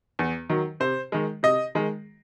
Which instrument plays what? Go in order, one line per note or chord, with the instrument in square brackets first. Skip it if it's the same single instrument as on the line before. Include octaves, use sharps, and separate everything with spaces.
[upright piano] E2
D#3 F#3
C3 C5
D#3 G#3
C3 D#5
D#3 G#3